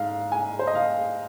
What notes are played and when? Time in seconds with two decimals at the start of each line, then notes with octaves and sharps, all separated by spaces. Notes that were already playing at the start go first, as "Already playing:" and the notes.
Already playing: G#2 F5
0.32 G#5
0.59 C5
0.67 D#5
0.75 F5